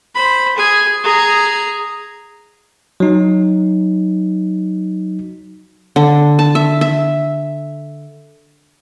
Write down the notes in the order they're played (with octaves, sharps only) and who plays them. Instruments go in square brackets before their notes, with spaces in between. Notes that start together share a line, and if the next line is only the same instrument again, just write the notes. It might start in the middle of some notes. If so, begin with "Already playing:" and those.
[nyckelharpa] C5 B5
G#4 G#5
G#4 A#5
[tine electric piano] F#3 D#4
[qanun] D3
A5
E5
E5